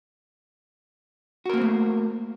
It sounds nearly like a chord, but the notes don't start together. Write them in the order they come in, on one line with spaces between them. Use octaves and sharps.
F#4 A#4 A#3 C4 A3